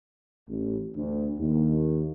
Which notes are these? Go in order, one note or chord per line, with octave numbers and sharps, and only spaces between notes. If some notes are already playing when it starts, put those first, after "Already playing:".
A1
D2
D#2